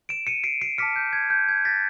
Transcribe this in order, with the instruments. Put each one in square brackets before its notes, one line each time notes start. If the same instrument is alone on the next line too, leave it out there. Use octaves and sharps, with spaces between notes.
[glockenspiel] D7 E7
C#7 D#7
C7 D7
C7 D7
A5 D6 F6 B6 C#7
G6
G#6
G6
G#6
A6 B6